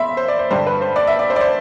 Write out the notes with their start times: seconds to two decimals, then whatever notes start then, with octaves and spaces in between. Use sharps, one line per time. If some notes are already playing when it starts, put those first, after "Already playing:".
Already playing: E2 E5 B5 C6
0.17 C5
0.28 D5
0.39 C5
0.51 G2 D3 G3 C5
0.66 B4
0.81 C5
0.96 D5
1.07 E5
1.19 D5
1.30 C5
1.36 D5
1.41 C5